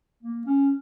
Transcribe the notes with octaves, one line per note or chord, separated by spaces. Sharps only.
A#3
C#4